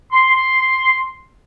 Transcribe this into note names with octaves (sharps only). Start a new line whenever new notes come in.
C6